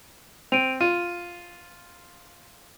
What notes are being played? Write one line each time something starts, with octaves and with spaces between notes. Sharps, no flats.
C4 D7 D#7 F7
F4 D#7